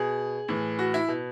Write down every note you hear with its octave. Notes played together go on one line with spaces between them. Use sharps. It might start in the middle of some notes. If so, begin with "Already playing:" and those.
Already playing: B2 G#4
A2 E3
F#4
E4
B2